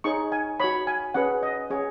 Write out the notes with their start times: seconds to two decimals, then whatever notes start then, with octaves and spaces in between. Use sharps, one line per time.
0.04 D#4 G#4 C#5 C#6
0.32 G#5
0.60 F#4 C#5 B5
0.87 G#5
1.14 C#4 G#4 B4 F#5
1.43 D#5
1.70 C#4 G#4 C#5